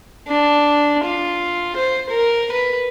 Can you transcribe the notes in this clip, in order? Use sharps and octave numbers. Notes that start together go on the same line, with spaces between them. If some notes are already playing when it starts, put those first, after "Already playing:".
D4
F4
C5
A#4
B4